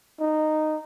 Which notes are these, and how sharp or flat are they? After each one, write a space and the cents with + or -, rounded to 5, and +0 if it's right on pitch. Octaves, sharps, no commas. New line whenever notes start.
D#4 -10